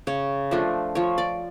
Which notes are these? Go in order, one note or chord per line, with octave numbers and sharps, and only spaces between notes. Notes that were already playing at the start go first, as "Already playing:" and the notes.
C#3 C#5
F3 A3 D4
F3 C#5
D5